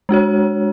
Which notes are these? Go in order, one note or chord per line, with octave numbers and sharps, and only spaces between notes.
G#3 D4 F#4 C#5